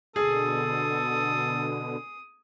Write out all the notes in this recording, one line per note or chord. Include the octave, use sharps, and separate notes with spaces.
B2 D3 G#4 A4 D#6